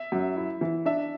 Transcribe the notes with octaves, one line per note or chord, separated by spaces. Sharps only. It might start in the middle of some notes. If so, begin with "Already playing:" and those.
Already playing: E5
F#2
E4
E3
D4 E5